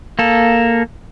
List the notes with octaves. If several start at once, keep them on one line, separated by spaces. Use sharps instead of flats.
A#3 A4